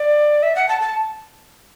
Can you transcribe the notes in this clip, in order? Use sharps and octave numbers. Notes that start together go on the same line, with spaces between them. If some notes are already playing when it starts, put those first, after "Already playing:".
Already playing: D5
E5
F#5
A5
A5